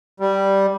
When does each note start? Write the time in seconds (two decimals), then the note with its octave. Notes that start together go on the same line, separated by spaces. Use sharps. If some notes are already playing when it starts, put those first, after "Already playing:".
0.20 G3